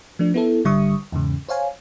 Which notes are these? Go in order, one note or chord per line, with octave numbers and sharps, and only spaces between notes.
F3 A3 D4
B3 E4 A4
G#1 D3 G3 E5 C#6 D#6
E2 G#2 C#3
C5 C#5 F5 G#5